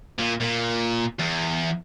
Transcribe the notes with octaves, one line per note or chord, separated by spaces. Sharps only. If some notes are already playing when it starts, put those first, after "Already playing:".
A#2
A#2
E2